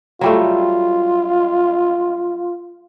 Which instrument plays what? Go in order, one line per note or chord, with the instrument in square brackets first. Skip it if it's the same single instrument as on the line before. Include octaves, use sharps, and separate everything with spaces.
[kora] F#3 G3 A3 [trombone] F4